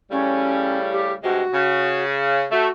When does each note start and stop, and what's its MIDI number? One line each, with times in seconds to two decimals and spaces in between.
0.11 1.16 45
0.11 1.16 49
0.11 1.16 55
0.11 0.77 61
0.92 1.12 67
1.23 1.42 43
1.23 1.42 48
1.23 1.42 56
1.23 2.03 66
1.54 2.45 49
2.51 2.68 57
2.51 2.70 66